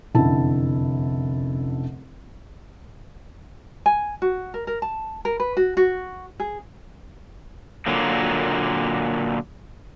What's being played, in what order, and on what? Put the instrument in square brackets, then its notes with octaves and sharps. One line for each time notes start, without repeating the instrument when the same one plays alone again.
[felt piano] F1 F#2 D3 E4 A5
[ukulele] G#5
F#4
A#4
A#4
A5
A#4
B4
F#4
F#4
G#4
[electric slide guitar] A#2 D3 F#3 A#3